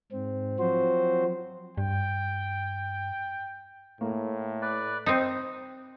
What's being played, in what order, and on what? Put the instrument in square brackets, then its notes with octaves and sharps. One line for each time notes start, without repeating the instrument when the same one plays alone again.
[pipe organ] G#2 C4
F3 F#3 C4 F#4 C5
[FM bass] G2 [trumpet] G5
[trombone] A2 [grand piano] A#3
[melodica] B4 D5
[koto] C4 D#4